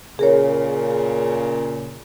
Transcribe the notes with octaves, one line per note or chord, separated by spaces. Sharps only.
A#2 C#3 G#4 A#4 C#5